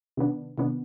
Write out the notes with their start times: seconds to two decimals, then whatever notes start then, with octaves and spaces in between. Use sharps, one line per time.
0.17 C3 D#3 B3 D4
0.58 C3 D#3 B3 D4